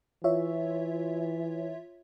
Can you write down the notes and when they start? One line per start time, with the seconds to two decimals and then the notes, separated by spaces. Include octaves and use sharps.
0.24 E3 F4 C#5 E5